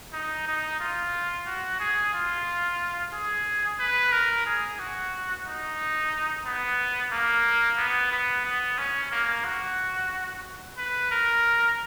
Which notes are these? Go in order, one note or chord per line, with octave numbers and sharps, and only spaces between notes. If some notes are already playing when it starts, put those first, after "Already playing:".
D#4
D#4
F4
F#4
G#4
F4
G#4
B4
A#4
G#4
F#4
D#4
B3
A#3
B3
B3
B3
C#4
A#3
F#4
B4
A#4